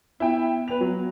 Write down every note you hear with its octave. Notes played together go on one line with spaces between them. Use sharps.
B3 E4 G5
B4 F7
F#3